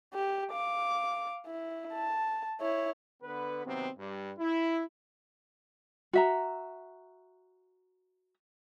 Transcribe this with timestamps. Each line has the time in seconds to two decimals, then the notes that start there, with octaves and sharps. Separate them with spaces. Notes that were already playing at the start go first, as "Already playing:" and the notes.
0.14 G4
0.52 F5 D6
1.46 E4
1.94 A5
2.61 E4 C#5
3.23 D3 B3 B4
3.65 C3 D#3 F#3 B3 C4
3.98 G2 G3
4.39 E4
6.13 F#4 E5 A#5